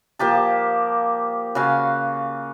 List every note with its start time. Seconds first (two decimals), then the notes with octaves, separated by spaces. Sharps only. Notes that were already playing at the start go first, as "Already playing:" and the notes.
0.19 F3 A#3 G4 A5
1.55 C#3 F#4 F5 G#5